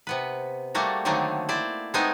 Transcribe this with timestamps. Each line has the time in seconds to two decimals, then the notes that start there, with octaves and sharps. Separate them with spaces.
0.07 C3 B3 B4
0.75 G3 A3 A#3 F#4
1.05 D3 D#3 F#3 A3 A#3 C4
1.49 E4 C5 D5
1.94 G#3 A3 B3 C4 D#4 G#5